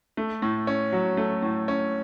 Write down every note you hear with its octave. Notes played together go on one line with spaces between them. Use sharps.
A3
A2
C#4
F#3
A3
A2
C#4